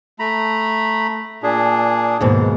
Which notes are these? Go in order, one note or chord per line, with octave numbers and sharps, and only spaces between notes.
A3 A#5 B5
A#2 D4 G#4
D#2 G#2 B2